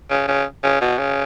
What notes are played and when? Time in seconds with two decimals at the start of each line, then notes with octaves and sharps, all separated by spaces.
0.10 C#3
0.28 C#3
0.64 C#3
0.81 B2
0.98 C#3